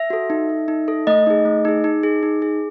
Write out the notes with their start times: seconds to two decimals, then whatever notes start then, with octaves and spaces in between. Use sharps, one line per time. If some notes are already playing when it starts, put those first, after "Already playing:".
Already playing: E5
0.10 F#4 A4
0.30 D#4
0.49 A4
0.68 D#4
0.88 A4
1.07 A3 D#5
1.27 D#4 G#4
1.45 A3
1.65 D#4 G#4
1.84 D#4
2.03 G#4
2.23 D#4
2.42 G#4